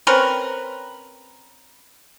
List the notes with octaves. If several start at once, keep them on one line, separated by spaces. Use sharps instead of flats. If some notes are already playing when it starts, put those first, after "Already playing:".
C4 C#4 A#4 B4